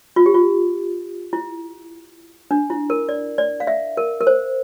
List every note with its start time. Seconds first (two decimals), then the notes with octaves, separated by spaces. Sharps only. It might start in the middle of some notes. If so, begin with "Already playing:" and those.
0.16 F4
0.26 G4
0.34 F4
1.33 E4
2.51 D4
2.70 E4
2.90 A#4
3.09 D5
3.38 D5
3.60 F5
3.67 E5
3.97 A#4
4.21 A#4
4.27 C5